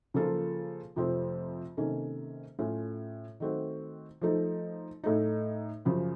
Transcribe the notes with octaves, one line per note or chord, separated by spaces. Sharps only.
C#3 F3 A#3 F4 A4
F2 C3 F3 A3 C4
C3 D#3 A#3 C#4 A4
A2 A3 C#4 F4
D#3 A3 C4 F#4
F3 A3 D#4 A4
A2 A3 D#4
F#2 C#3 F3